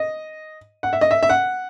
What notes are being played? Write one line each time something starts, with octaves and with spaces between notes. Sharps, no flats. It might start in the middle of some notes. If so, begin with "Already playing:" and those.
Already playing: D#5
F#5
E5
D#5
E5
E5
F#5